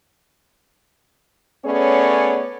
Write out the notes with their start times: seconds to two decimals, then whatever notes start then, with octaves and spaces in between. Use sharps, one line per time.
1.65 A3 B3 C#4 G#4 C#5 D5